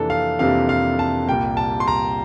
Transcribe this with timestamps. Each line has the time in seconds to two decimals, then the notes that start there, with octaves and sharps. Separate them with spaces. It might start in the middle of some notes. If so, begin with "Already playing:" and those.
Already playing: F2 C3 E3 A#3 D4 A4
0.10 F5
0.39 F2 C3 E3 A#3 D4 F5
0.69 F5
0.99 A5
1.27 C2 A#2 G3 A#3 G5
1.57 A5
1.80 C6
1.88 A#5